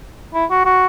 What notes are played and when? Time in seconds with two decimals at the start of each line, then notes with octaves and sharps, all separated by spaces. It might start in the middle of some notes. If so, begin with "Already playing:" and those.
0.34 E4
0.50 F#4
0.65 F#4